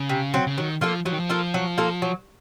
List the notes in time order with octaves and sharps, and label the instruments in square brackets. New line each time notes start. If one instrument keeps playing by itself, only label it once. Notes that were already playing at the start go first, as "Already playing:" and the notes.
Already playing: [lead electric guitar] C#3
[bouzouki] C3
F#3 C4
[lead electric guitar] C#3
[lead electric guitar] D#3 [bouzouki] F#3
[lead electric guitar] F3 [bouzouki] A#3 F4 A4
[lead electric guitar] F3 [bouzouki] F#3
[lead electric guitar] D#3
F3
[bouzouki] A#3 F4 A4
F#3
A#3 F4 A4
F#3